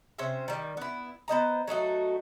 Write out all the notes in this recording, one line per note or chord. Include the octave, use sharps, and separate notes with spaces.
C3 C#4 C5 E5
D#3 G3
B3 E4
B3 C5 D#5 A#5
F#3 A3 D#4 F#4